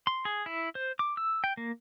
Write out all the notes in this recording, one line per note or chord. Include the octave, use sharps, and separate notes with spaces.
C6
G#4
E4
C5
D6
E6
G5
A#3